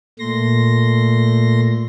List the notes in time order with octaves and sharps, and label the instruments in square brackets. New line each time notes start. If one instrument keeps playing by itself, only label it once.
[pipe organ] A#2 A3 C6 A#6